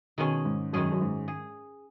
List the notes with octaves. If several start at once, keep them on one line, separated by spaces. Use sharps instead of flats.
B2 D#3 G#3 C#4 G#4
G#2
F#2 D#3 G#3 C#4 G#4
F#2
G#2
G#4